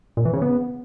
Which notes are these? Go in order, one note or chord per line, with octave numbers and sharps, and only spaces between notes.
A#2
E3
C#3
B3